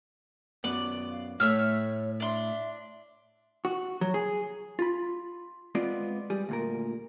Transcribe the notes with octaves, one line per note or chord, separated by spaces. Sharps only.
F#2 B3 D5
F5
A2 A3 C#5 E5 E6 F6
D4 E5 C6
F#4
F#3
G#4
F4 B5
G#3 B3 C4 F4 D5
G3 G#4
D2 A#2 A#4